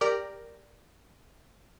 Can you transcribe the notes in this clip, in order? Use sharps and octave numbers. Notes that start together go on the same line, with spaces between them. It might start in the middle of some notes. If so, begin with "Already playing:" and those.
G4 A#4 D5